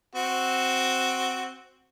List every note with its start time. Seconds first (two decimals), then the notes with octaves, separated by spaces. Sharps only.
0.15 C4 F#4